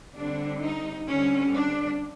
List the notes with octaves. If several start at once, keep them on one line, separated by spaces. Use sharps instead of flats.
D3 G3 C4 D4
D#4
D3 G3 C4 C#4
D4